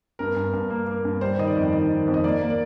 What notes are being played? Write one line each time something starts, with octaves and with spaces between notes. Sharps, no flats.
G2 A#4
G2
G2
A#3
A#3
G2
G3 C5
D#3 D#5
D5
F2
D#3 D#5
D#3
F2
D#5
A#3 D5
A#3
D5